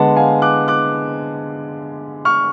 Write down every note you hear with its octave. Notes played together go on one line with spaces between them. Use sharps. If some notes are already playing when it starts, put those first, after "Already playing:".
Already playing: D3 G#3 B3 F#5 A5
F5 G#5
D6 F#6
D6 F#6
C#6 F6